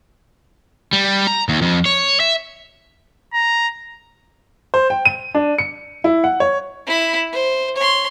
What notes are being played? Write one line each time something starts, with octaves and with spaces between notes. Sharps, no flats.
G3
A#5
D#2
F2
C#5
E5
A#5
C5
G5
D#7
D4
C#7
E4
F#5
C#5
E4 B5
C5
C#5 C6